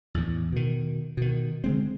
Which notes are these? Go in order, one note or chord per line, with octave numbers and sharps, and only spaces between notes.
E2 A2
B2 D#3
B2 D#3
D3 G#3 C4